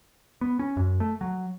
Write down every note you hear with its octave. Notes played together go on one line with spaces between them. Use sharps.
B3
C#4
F#2
A3
F#3